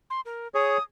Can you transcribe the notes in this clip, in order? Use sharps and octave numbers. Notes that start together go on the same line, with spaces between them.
C6
A#4
G#4 C#5 D#6